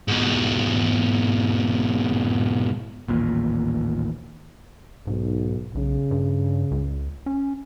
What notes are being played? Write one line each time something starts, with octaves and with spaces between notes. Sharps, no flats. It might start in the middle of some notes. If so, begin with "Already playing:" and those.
G#2 B2
A1 D#2 A#2
B1 G#2
B1 C#3
G2
C#2
C#4